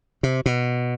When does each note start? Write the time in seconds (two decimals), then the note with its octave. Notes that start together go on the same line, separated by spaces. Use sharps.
0.23 C3
0.46 B2